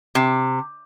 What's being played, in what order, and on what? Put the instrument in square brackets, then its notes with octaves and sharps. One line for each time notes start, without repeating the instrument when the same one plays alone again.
[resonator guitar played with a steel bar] C3